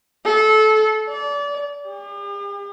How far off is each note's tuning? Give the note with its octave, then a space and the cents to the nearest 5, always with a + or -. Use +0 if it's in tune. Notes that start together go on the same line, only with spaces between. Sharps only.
A4 -25
D5 -30
G4 +45